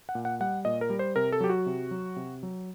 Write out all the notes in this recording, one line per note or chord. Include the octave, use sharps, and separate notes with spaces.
F#5
A#2
F#5
G3 F#5
A#2 D#5
A#4
G3
C5
C3 A#4
A4
F#3 G4
F#4
C3
F#3
C3
F#3